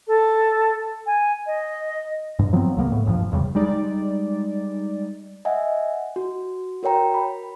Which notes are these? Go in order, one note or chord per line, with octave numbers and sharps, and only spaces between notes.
A4
G#5
D#5
G2
F3 F#3 B3 C4
C#2 C#3 A#3 B3
A2
E1 G2 F3
E1 E2 C#3 G3
G3 G#3 D#4 D5
D#5 E5 F#5 G#5
F#4
F#4 A#4 C#5 G5 A#5
B5